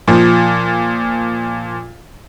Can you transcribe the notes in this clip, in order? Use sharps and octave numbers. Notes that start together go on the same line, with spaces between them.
A#2 F3